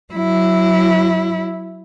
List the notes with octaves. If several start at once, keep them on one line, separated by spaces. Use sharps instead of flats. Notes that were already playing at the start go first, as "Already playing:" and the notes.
F#3 E4